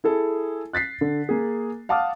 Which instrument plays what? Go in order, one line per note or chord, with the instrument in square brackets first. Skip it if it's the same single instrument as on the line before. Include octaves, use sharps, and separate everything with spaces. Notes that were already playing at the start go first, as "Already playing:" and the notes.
[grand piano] E4 G#4 A4
F#6 A6 B6 C7
D3
A#3 G#4
F5 F#5 A5 D6 D#6 F6